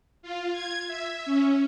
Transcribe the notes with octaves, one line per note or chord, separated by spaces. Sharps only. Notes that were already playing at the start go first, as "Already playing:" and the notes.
F4
G#6
E5
C#4